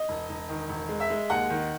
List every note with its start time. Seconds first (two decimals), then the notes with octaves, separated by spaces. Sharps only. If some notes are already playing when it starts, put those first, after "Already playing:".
Already playing: D#5
0.09 E1
0.29 E1
0.49 D#3
0.69 E1
0.89 G#3
1.00 E5
1.10 G#3
1.30 D#2 F#5
1.50 D#3